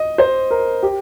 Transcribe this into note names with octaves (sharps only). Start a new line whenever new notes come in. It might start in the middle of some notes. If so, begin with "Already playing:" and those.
Already playing: D#5
C5
A#4
G4